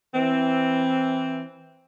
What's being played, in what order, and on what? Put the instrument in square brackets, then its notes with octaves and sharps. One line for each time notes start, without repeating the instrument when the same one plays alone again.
[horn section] E3 C4